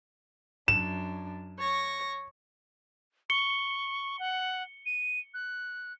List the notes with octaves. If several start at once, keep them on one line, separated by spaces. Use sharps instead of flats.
F#2 D4 E7
C#5 C#6 A#6
C#6 C#7 G7
F#5
D#7
F#6